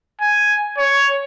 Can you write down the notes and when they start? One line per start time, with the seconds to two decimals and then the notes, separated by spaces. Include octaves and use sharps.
0.21 G#5
0.78 C#5